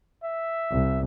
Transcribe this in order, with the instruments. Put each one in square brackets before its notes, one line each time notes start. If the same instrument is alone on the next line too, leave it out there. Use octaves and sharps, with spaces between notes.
[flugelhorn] E5
[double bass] C2